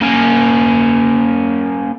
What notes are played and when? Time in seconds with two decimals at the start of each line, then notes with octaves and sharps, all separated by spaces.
0.02 A#3 C#4